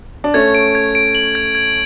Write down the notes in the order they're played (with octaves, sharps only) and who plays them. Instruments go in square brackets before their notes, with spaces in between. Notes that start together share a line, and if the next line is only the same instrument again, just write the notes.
[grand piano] D4
[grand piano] A3 C#4 [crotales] G#6
[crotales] D7
G#6
D7
F#7
G#6
G#6